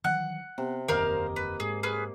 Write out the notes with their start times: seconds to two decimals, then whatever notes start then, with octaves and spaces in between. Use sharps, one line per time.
0.04 D#3 E3 F#3 F#5 F#6
0.58 C3 B3
0.88 F#1 E2 D#3 A#3 A#4 C5 D#5 F5
1.36 B4
1.60 G#2 G#4
1.83 G#4 B4 F6